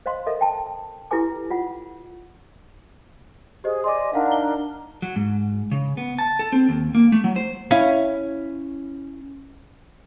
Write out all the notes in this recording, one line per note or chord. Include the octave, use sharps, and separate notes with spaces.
C5 D#5 F5 C6
A4 A#4 D#5 E5
G5 A5
E4 G4 A4 B4 G#5 D6
F4 F#5
G4 G#4 C5 D#5
D5 D#5 G#5 C6 D6
D4 D#4 A#4 F5 F#5
G7
F#3
G#2
C#3
B3
A5
A4
C4
D#2
A#3
A3
F#3
C5
C#4 E4 C#5 F5